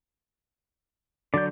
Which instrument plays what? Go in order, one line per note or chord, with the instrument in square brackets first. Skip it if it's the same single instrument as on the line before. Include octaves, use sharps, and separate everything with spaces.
[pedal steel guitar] D3 F#3 G6 [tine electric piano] D5